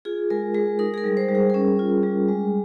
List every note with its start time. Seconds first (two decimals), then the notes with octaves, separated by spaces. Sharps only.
0.05 F4 G#4
0.30 G#3 A#4
0.54 G#3 G#4
0.79 D#4 A#4
0.94 G#4
0.98 A#4
1.04 G3
1.17 C5
1.29 G3
1.35 G#4
1.50 A#4
1.54 C#4 G#4
1.79 F4
2.03 G3
2.28 G#3